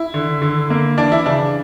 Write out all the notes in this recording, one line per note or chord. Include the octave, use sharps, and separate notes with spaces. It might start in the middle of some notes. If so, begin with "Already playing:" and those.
Already playing: E4
D3
D3
A#3
E3 D4
E4
C#3 D4